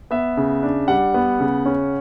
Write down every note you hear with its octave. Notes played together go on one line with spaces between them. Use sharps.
B3 E5
C#3
D4
G3 F#5
B3
C#3
C#4